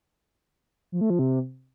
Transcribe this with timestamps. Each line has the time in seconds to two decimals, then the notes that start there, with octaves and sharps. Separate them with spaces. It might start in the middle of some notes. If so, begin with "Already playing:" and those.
0.92 F3
1.01 A3
1.10 F3
1.19 C3